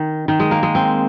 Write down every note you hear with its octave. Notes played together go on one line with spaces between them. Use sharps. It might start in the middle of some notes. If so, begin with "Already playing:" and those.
Already playing: D#3
D#3
G#3
A#3
G#3
C4